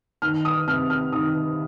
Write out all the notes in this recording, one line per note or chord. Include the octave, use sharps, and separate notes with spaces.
D#3 F6
D#6
C3 F6
F6
D#3 D#6